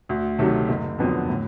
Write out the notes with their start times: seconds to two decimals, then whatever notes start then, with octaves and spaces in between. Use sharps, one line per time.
0.09 D2
0.39 C3 D#3 F#3 A3
0.69 F#1
0.99 F2 D3 F#3 B3
1.29 A2